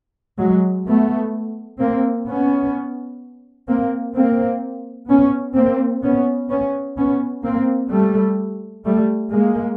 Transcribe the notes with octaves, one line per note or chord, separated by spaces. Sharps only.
F#3 G#3
A3 B3
A#3 C4
B3 C#4
A#3 C4
A#3 C4
B3 C#4
A#3 C4
B3 C#4
B3 C#4
B3 C#4
A#3 C4
G3 A3
G3 A3
G#3 A#3